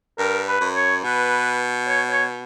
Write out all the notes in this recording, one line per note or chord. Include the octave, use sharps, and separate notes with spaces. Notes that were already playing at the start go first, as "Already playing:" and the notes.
G2 A#4
B4
F#2
C#5
B2 B4
C#5
C#5